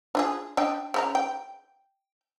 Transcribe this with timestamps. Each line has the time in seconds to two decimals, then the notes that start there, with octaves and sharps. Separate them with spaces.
0.15 D4 F4 G#4
0.57 D4 D#5 G5
0.94 C#3 F4 A#5
1.15 G5